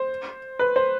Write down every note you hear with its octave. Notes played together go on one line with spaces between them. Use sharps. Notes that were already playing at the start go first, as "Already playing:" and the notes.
Already playing: C5
B4
C5